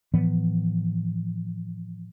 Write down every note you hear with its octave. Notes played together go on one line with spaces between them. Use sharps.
A2 E3 F3 B3